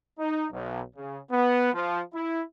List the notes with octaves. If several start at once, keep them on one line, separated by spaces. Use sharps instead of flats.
D#4
B1
C#3
B3
F3
E4